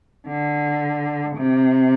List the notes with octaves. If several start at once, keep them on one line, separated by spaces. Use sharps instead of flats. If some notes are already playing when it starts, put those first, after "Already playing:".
D3
C3